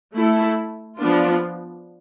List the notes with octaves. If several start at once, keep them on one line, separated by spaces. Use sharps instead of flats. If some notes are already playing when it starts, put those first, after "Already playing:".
A3 E4 A4
F3 B3 D4 F4